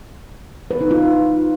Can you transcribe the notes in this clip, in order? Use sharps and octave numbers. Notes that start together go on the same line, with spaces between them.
B4
D#4
F4